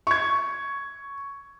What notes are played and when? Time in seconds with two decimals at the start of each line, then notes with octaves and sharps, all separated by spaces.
0.07 C#6 G#6